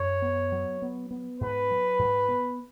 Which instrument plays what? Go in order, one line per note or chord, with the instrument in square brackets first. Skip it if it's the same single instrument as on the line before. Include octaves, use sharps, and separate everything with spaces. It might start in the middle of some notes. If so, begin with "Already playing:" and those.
Already playing: [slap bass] F#2 F#3 [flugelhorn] C#5
[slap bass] B3
F#3
B3
B3
[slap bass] G#2 [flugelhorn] B4
[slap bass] F#3
G#2
B3